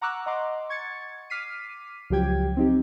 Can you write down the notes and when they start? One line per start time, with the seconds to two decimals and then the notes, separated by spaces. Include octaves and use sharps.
0.01 F#5 A#5 C#6 D6 E6 F#6
0.26 D#5 F#5 A#5 C6 D6
0.69 C#6 G#6 A6 C#7
1.30 D6 F6 B6 C7 D#7
2.10 C#2 F3 F#3 G4 G5 G#6
2.57 C4 D#4 G4